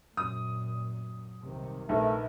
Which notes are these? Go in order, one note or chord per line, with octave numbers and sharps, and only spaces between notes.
F#2 A#2 D#6
C2 C3 D#3
A#1 A3 D#4 A#4 B4